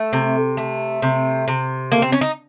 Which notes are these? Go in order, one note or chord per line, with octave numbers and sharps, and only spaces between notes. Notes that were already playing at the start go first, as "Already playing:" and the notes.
Already playing: A3
C3
A3
C3
C3
A3 A#3
C4
C#4
D#4